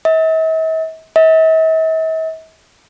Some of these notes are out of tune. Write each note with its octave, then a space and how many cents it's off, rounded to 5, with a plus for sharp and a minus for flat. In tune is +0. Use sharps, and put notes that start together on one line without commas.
E5 -45
E5 -45